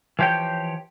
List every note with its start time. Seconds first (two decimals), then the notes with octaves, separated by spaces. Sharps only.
0.19 E3 F3 G4 C#5 G5